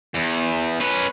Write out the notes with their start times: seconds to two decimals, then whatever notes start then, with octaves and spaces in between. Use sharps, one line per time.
0.14 E2
0.80 C#4 B4